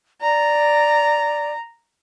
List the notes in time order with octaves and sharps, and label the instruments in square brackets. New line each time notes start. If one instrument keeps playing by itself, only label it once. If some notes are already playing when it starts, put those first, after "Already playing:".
[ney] D5 [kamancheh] A#5